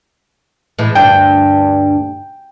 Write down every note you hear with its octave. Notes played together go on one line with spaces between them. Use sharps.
A2 E3 G#3
D2 G2 D4 G5